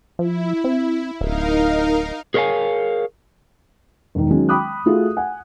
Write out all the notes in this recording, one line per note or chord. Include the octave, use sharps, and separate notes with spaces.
F3 E4
C4
D1 D#4 A#4 F5
G#4 A#4 C#5 D5 F5 G#5
E1 D#3
D#3 F#3 G#3 C#4
G5 B5 D6 D#6 F#6
A3 F4 F#4 G#4 A4
F#5 G#5